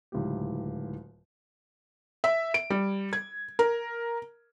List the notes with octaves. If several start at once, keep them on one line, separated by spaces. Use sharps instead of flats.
D1 C#2 A2 D#3 G4
E5
D7
G3
G#6
A#4